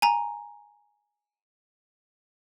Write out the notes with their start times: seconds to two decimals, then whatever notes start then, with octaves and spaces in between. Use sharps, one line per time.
0.02 G#5 A#5